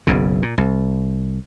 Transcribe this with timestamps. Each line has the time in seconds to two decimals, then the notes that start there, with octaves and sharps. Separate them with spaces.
0.07 F#1 B1 F#2 C#3
0.42 A#2
0.58 C2